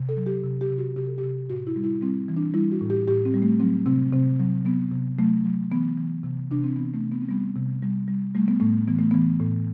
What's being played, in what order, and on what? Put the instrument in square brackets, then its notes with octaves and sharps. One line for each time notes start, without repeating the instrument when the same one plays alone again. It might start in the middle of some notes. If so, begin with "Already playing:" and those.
Already playing: [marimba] C3
A4
F#3
G4
C3
G4
C3
F#4
C3 G4
A4
G4
C3
A2 F#4
E4
G3
E4
G3 C4
E3
D4
G3 E4
F#4
A2
G4
A2 G4
C4
G3
A3
F#3 C4
C3 C4
C3 C4
F#3
F#3 B3
C3
F#3 A3
F#3
E3 B3
E3
C3
C3 D4
C4
E3 B3
A3
C3
B3
C4
G3 B3
C3
G3
G3
G3 A3
B3
A2 A3
E3 B3
A3
E3 B3
A2